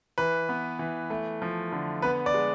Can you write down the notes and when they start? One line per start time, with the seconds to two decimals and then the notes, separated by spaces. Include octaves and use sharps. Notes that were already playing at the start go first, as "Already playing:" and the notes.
0.18 E3 B4
0.49 B3
0.79 E3
1.10 A3
1.42 F3
1.72 D3
2.02 B3 B4
2.26 D5
2.34 G#3